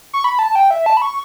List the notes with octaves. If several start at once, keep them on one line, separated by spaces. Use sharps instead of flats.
C#6
B5
A5
G5
E5
A5
B5
C#6